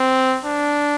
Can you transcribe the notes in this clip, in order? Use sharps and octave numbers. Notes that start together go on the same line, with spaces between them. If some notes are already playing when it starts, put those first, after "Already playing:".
Already playing: C4
D4